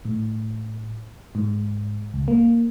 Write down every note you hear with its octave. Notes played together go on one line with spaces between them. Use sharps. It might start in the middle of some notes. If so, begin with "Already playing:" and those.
A2
G#2
C#2
A#3